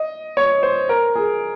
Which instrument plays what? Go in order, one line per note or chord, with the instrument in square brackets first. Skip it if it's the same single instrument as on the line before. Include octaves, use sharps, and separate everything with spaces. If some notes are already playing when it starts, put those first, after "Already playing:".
Already playing: [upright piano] D#5
C#5
C5
A#4
G#4